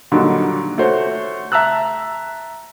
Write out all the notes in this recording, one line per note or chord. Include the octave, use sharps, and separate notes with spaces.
A#2 D3 D#3 F#3 G3
A3 F#4 C5 C#5
E5 A5 A#5 E6 F#6